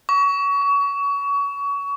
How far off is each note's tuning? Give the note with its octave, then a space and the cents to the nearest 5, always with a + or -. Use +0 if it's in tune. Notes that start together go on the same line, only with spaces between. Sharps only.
C#6 +30
C#6 +35